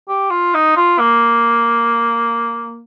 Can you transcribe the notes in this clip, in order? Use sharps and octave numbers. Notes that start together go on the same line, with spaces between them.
G4
F4
D#4
F4
A#3